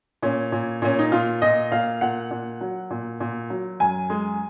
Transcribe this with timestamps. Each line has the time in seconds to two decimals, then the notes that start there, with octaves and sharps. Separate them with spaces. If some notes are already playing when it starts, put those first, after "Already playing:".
0.22 A#2 C#4
0.52 A#2
0.82 A#2 C#4
0.99 D#4
1.12 A#2 F4
1.42 A#2 D#5
1.72 A#2 F5
2.01 A#2 F#5
2.31 A#2
2.61 F#3
2.90 A#2
3.20 A#2
3.50 F#3
3.80 F#2 G#5
4.10 G#3